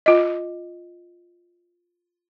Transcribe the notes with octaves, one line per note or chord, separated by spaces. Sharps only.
F4 D#5